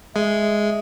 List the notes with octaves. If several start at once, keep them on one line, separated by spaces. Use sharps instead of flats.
G#3 E5